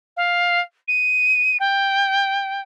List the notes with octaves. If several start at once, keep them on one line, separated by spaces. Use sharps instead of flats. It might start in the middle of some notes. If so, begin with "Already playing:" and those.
F5
D#7
G5